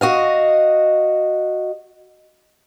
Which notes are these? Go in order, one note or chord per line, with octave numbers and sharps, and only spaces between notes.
F#4 D#5 F5